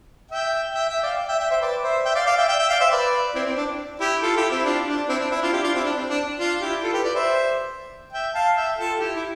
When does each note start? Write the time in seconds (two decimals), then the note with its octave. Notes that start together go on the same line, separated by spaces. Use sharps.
0.31 E5 G5
0.74 E5 G5
0.89 E5 G5
1.03 D5 F5
1.28 E5 G5
1.39 E5 G5
1.50 C5 E5
1.61 B4 D5
1.83 C5 E5
2.05 E5 G5
2.15 D5 F5
2.27 D5 F5
2.37 E5 G5
2.48 E5 G5
2.59 E5 G5
2.70 D5 F5
2.80 C5 E5
2.91 B4 D5
3.34 C4 E4
3.47 C4
3.57 D4
4.00 E4 G4
4.22 F4 A4
4.37 E4 G4
4.50 C4 E4
4.65 D4 F4
4.88 D4
5.09 C4 E4
5.20 D4
5.31 C4 E4
5.41 D4 F4
5.53 E4 G4
5.63 D4 F4
5.74 C4 E4
5.85 D4
5.96 C4
6.10 D4
6.39 D4 F4
6.61 E4 G4
6.83 F4 A4
6.93 G4 B4
7.04 B4 D5
7.15 C5 E5
8.13 E5 G5
8.35 F5 A5
8.56 E5 G5
8.78 F4 A4
9.00 E4 G4
9.16 E4